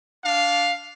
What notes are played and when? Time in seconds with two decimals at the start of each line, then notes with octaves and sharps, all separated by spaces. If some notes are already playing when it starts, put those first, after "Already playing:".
0.25 D4 F5